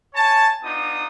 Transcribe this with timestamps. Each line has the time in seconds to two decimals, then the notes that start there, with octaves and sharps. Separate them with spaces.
0.14 C#5 G#5 A5
0.63 B3 D4 D#4 F4 D#6